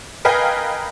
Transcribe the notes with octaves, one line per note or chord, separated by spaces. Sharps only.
A#4 B4 D#5 F5 G5 G#5